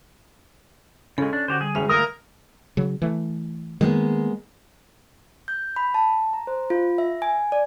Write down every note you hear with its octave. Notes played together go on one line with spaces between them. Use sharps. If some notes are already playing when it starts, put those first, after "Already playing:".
C#3 G#3 C#4 A4
D4
D3 F#4 G4 C5
G3 G#4
E1 C#4 G#4 E5 F7
E3 A3 A#3 A#4 D#6 D#7
C#3 F#3
E3 A3
D#3 G#3 A#3 B3
G6
B5
A5
A#5
C5
F4
E5
G#5
D5